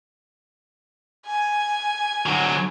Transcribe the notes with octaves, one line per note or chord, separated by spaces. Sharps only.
G#5
D3 F#3